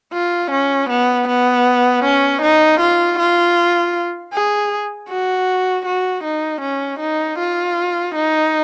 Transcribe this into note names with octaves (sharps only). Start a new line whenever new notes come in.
F4
C#4
B3
B3
C#4
D#4
F4
F4
G#4
F#4
F#4
D#4
C#4
D#4
F4
D#4